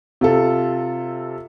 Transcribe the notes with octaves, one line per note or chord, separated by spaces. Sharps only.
C3 F4 A4